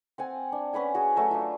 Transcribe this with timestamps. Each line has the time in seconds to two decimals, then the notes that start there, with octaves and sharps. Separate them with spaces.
0.18 C4 F#5 G#5
0.52 D4
0.73 C#4 B4 F#5 G#5
0.95 F#4 G#4
1.16 F#3 A3 F#4
1.31 D4 F4